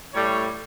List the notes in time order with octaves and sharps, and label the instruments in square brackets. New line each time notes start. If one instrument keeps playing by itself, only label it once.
[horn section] A2 G3 C#5